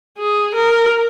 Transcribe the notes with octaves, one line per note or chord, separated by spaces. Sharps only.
G#4
A#4